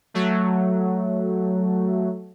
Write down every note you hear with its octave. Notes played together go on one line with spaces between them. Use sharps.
F#3 A3